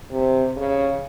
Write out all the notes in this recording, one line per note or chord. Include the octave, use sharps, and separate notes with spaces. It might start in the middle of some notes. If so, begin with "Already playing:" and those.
C3
C#3